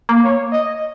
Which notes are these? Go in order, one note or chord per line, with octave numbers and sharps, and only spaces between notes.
A#3
C#5
D#5